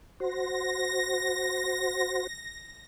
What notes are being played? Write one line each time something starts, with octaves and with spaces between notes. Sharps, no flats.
F#4 C5 A#6